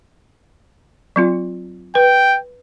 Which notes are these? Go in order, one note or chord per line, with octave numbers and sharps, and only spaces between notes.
F#3 C4 F4
B4 G5